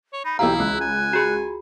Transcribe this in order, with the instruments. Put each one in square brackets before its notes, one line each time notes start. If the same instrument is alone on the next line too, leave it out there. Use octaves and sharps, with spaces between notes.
[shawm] C#5
[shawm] D#4 [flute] B5
[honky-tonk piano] B1 E3 F5 [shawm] E4 [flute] G4 [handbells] A#5 E6
[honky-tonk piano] C#2 [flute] F#6
[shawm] G#5
[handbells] F#4 G#4 B5